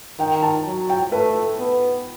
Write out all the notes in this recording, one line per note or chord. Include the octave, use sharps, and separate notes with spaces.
D#3 G5
A5
F#3
G5
A3 B4
B3